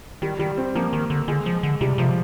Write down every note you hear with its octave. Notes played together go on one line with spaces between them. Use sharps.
D#3 G3
D#3 G3
C4
F3 A#3
D#3
D3
D3 G#3
F3
D3
C3 G3
C3 F3